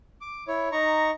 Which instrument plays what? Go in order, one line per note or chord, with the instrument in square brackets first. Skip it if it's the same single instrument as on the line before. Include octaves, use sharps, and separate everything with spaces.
[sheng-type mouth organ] D6
E4 C#5
D#4 A#5 C#6